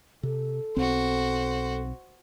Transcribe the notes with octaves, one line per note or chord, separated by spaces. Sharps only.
C3 A4
B1 C4 F#4 C5